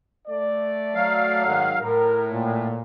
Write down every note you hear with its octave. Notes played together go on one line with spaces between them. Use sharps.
A3 D5
F#3 F5
G#2 D#3 F#5
A2 A#4
A#2